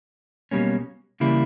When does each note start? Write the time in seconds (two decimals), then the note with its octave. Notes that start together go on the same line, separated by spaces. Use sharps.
0.51 B1 B2 G3 A#3 C#4
1.20 C#3 E3 G3 A#3 E4